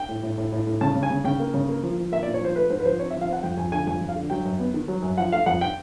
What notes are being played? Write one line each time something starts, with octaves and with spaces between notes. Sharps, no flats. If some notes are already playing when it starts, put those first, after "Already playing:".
Already playing: G5
A2
A2
A2
A2
A2
C#3 A5
C#3
G#5
C#3
C#3 G5
A#3
C#3
A#3
F3
F3
A#3 E5
A#2 D5
C#5
F3 C5
A3 B4
G#2 C5
B4
F3 C5
C4 C#5
F3 E5
F5
C4 F#5
F2 G5
F2 G#5
D3 G#5
F2 G#5
F2
F5
D3
F#3 G5
F#2
B3
D#3
F#3
F#2
F3 F#5
A3 F5
F2 F#5
G5